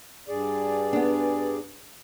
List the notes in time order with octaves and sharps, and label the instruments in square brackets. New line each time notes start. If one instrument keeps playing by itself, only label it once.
[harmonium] G2 G#4 D5
[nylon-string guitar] B3 D4